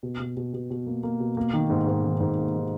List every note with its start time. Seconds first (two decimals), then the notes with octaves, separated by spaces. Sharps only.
0.03 B2
0.20 B2
0.37 B2
0.54 B2
0.71 B2
0.87 A#3
1.03 A#3
1.20 B2
1.37 A#3
1.53 D#3
1.70 G#2
1.87 G#2
2.04 D#3
2.20 G#2
2.37 A#3
2.54 D#3